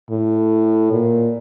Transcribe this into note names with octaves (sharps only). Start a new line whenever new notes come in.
A2
A#2